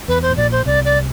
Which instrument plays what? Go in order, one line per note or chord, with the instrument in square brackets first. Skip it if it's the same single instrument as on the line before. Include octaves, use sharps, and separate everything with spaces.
[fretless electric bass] E2 [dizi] B4
[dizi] C5
[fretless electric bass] A2
[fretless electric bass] A#1 A#2 [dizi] D5
[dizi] C5
[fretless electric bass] C2 C3 [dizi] D5
[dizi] D5